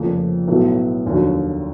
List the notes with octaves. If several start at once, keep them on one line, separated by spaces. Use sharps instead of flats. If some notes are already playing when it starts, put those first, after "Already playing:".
Already playing: F1 F2 C#3 F3 A#3
B1 A2 F#3 B3
F1 D#2 D3 F#3